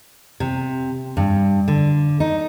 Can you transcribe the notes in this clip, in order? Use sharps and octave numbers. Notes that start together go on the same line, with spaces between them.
C3
G2
D3
D#4